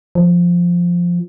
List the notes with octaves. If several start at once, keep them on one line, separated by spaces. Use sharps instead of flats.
F3